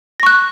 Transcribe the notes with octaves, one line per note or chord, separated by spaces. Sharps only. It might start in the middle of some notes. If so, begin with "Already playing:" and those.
C#6 F#6 A#6